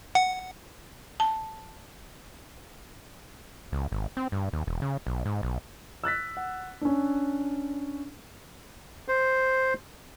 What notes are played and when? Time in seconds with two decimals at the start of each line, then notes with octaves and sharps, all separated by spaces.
0.15 F#5
1.20 A5
3.72 C#2
3.92 G#1
4.17 C4
4.32 G2
4.53 D#2
4.67 E1
4.82 C#3
5.07 B1
5.25 G#2
5.43 B1
6.04 E6 F#6 A6 B6
6.37 F#5
6.81 C#4 D4
9.08 C5